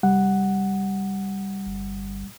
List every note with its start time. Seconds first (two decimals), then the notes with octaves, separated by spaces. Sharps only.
0.03 C2 G3 F#5
1.66 G1